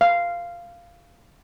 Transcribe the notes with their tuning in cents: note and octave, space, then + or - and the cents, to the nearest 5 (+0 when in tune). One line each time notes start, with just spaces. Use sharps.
F5 -10